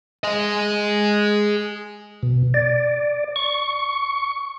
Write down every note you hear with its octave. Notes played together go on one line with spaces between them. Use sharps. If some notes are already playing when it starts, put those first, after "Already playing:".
G#4 D#5
B2
D5
C#6